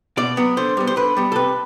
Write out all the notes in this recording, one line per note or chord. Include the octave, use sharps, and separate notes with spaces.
B2 D5
F#3 B3
D3 C5
G3 B3
C5
D3 B4
G3 B3
A4
C3 B4